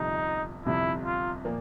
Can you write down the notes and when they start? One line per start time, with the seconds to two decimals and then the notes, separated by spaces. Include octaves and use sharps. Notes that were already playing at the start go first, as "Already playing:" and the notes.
Already playing: G1 F2 C3 D#4
0.66 G1 F2 C3 E4
1.05 F4
1.45 A#2 F3 A#3